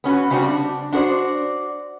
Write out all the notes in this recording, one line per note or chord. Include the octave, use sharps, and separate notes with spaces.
B3 C#4 F#4 B4
C#3 G3 C4 D4 F#4
D4
D4 F#4 A#4 C5 D5